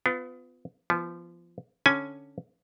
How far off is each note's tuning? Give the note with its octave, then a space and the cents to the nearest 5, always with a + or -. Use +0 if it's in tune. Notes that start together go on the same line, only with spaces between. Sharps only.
B3 +30 F4 +0
F3 -25 B3 +0
D3 +0 C#4 +0 G#5 +5